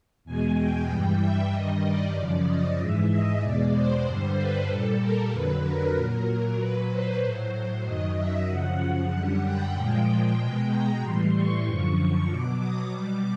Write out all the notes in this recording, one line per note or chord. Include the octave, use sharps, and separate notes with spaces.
E2 B2 G#3 G#5
G5
G2 E3 G3
E5
G2 D#3 G3 D#5
D5
F#2 C#3 F3
D#5
G#2 E3 G#3 E5
D#5
E2 B2 G#3 D5
C5
G2 D3 G3
B4
A#2 G3 A4
A#4
F2 D3 F#3 B4
A#4
A#2 F#3 A#4
A#4
A#2 F#3 B4
C5
A2 F#3
F#2 D#3 F#3 D#5
E5
F#2 C#3 F3 F#5
F#2 D3 G3
G5
A#2 F3 G#3 G5
B2 G#3
A#5
A2 E3 G3 C6
C#6
F#2 D3 F3
B2 F#3 D6
D#6
B2 G3 D6